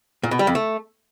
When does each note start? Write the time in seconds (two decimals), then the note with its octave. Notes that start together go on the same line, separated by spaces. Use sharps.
0.23 A#2
0.31 B2
0.39 G3
0.47 F2
0.55 A3